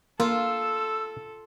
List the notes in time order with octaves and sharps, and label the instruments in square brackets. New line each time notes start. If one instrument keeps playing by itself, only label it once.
[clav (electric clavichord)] A#3 [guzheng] F4 [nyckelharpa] A4 [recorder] E6